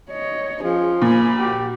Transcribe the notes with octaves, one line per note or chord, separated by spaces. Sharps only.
C#5 D#5
F3 C#4 G#4
A#2 G#5 B5
F#4 G4